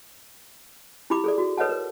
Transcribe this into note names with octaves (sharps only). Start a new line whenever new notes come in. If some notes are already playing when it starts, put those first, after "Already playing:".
E4 F4 G4 B5 D6
G#4 A4 D5
F#4
A4 B4 C#5 D#5 F#5 A5
A#4